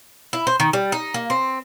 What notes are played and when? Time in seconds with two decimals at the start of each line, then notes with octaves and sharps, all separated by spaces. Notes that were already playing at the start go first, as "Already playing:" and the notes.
0.33 E4
0.47 C5
0.60 D#3
0.73 G3
0.92 D#4
1.14 A#3
1.30 C4